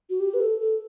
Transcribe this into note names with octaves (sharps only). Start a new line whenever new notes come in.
F#4
G4
B4
A4
A4